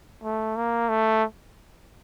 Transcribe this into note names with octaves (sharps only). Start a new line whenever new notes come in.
A3
A#3
A3